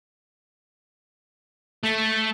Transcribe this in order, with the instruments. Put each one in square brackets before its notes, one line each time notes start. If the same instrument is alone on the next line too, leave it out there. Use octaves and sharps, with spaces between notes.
[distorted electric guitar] A3